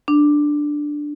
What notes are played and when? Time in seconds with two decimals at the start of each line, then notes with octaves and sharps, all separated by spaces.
0.08 D4